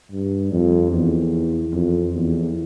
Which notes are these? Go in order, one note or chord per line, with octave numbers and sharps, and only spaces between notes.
G2
F2
E2
F2
E2